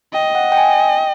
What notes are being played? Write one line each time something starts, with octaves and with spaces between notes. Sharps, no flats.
D#5 G5
F#5
G5
G#5
G5